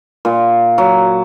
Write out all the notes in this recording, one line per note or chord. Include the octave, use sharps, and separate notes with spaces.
A#2
F#3